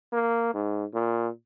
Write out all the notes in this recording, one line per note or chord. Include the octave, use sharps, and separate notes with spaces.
A#3
G#2
A#2